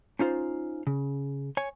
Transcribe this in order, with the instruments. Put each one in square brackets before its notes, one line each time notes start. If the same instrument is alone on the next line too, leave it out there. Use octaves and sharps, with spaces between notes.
[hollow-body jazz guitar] C#4 D#4 F4 C5
C#3
C#5 G#5